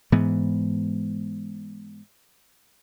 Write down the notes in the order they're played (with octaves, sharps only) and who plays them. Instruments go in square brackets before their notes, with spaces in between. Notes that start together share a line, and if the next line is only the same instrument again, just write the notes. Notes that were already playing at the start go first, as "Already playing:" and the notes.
[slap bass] G#2 E3 B3